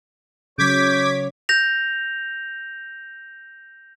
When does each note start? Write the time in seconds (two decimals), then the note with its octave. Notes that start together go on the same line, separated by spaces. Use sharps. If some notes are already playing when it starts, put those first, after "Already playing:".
0.58 C#3 F#3 C#5 D6 G6 G#6 B6
1.49 G6 A#6 F7